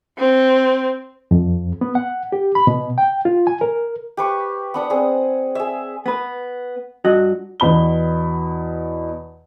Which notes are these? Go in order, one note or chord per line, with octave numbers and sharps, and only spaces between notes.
C4
F2
B3
F#5
G4
B5
B2
G5
F4
G#5
A#4
G4 B4 C#6
B3 D4 F#5
C4 G#4 D#6
G#4 E5
B3 B4
G2 F#4 D#5
E2 B2 B5 G7